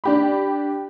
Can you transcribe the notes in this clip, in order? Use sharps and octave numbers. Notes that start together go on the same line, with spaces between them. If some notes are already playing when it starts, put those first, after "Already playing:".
D4 G4 B5